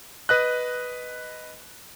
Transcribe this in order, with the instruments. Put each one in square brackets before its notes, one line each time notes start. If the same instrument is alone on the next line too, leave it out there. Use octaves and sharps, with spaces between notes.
[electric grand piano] B4 D#5 F#6